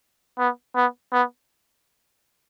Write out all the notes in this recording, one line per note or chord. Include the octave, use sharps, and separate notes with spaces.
B3
B3
B3